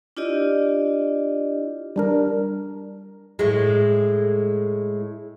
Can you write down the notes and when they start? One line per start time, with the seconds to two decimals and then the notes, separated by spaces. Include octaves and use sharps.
0.17 D4 E4 F4 G4 D5 D#5
1.96 G3 D4 A#4
3.39 A2 G#3